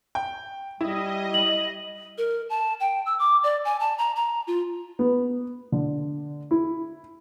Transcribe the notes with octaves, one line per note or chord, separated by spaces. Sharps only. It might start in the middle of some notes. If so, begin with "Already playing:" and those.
G5
G3 E4 D#5
F#7
A#4
A5
G5
E6
D6
D5
G#5
A5
A#5
A#5
F4
B3
D3
E4